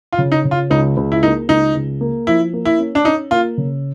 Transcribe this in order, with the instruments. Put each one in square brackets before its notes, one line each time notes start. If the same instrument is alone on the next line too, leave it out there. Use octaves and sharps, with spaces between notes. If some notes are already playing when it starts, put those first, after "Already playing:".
[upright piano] F4
[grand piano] C#3
[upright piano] D#4
[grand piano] C#3
[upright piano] F4
[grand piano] C#2 [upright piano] D#4
[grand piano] C#2
[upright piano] E4
[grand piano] A#3 [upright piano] D#4
[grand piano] C#2 [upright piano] D#4
[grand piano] C#2
A#3
[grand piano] F3 [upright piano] E4
[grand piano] A#3
[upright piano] E4
[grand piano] C#4
[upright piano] D4
[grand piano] C#4 [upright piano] D#4
[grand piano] A#3 [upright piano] F4
[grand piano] C#3